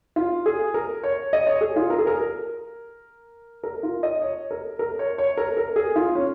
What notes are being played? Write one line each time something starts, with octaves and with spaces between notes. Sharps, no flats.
F4
G#4
A#4
C#5
D#5
C#5
G#4
F4
A#4
G#4
A#4
A#4
A#4
F4
D#5
C#5
A#4
A#4
C#5
C#5
A#4
A#4
G#4
F4
C#4